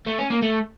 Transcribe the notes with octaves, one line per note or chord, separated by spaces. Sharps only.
A3
C#4
A#3
A3